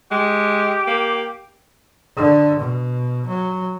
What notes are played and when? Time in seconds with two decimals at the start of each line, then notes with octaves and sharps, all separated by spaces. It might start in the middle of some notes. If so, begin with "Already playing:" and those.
0.11 G#3 G4
0.87 A#3
2.17 D3
2.60 B2
3.27 F#3